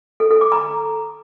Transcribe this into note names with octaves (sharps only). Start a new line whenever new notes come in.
A4
A4
D6
A#5